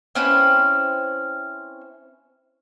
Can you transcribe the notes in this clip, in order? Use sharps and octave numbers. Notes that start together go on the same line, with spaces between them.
C4 C#4 E4 B4